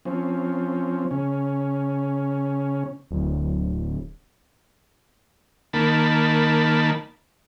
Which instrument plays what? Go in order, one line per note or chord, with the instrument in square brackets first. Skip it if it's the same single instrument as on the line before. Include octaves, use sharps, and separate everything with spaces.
[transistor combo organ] F3 C4 C#4
C#3 C#4
[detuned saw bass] D1
[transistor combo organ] D#3 A#3 A5 B5